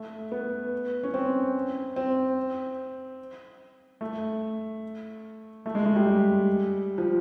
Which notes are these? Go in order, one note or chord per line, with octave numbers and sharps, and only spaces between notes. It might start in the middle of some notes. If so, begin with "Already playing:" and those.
Already playing: A3
B3
C#4
C4
C4
A3
A3
G#3
G#3
G3
F3